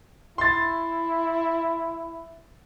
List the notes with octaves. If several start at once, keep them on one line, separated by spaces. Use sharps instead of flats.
E4 C6 A6